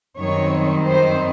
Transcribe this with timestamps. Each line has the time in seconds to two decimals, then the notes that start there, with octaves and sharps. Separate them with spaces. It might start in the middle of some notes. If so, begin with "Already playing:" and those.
0.18 F#2 D#3 G3 C4 D#4 C#5
0.90 C5